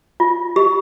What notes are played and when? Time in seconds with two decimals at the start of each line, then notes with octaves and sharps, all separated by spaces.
0.20 F4
0.56 G4